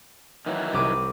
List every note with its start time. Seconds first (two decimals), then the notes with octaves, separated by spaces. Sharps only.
0.46 D#3 E3 F#3
0.73 C2 D6 D#7